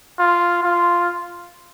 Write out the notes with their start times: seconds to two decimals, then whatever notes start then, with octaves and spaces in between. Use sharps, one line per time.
0.19 F4
0.63 F4